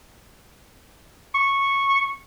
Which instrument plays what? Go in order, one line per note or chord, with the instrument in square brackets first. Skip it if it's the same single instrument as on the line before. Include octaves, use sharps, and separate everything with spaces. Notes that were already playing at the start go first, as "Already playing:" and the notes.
[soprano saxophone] C#6